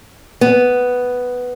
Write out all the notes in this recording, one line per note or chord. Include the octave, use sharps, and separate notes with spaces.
B3